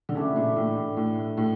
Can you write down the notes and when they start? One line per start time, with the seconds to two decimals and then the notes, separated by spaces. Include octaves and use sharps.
0.09 D3
0.15 C#3 E3 A3 D4 G4
0.36 A#2
0.56 A2
0.77 A2
0.97 A2
1.37 A2